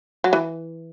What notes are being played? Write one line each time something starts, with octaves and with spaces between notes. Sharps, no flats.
F#3
E3